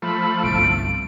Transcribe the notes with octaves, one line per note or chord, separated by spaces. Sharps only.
F3 A3 B5
G1 C2 D7